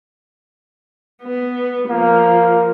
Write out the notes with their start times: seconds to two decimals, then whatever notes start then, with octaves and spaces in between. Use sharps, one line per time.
1.23 B3
1.90 F3 A#3